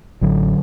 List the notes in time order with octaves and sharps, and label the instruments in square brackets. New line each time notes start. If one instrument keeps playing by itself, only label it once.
[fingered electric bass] A1 D3 F#3